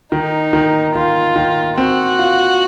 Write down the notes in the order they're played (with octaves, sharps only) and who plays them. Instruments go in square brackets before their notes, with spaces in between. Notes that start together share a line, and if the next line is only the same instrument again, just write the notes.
[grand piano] D#3 [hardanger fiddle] D#4
[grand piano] D#3
[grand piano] D#3 [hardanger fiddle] F4
[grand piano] D#3
[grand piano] C4 [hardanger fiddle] F#4
[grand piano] F4